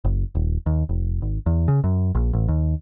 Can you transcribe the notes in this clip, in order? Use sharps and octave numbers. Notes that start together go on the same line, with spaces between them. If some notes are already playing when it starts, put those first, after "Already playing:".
F#1
D#1
D#2
F1
G#1
E2
C#3
F#2
A#1
A1
D#2